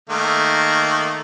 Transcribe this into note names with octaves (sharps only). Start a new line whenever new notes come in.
D#3 A3 A#3